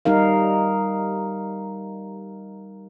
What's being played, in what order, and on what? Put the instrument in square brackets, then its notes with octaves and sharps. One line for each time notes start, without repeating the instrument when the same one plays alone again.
[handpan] G3 D#4 A#4 F5